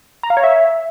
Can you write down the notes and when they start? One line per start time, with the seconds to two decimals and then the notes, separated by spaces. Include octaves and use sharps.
0.23 A#5
0.30 F5
0.37 C#5
0.44 E5